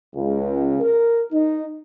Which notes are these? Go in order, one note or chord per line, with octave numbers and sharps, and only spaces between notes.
C#2
A#4
D#4